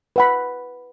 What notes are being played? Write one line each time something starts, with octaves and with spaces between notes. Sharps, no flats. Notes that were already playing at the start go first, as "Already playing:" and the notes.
B4 F#5 B5